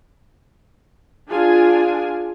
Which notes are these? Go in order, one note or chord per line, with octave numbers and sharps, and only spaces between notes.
D4 F4 G#4 G#5